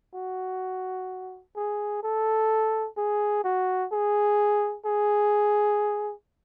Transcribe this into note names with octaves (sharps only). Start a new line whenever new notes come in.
F#4
G#4
A4
G#4
F#4
G#4
G#4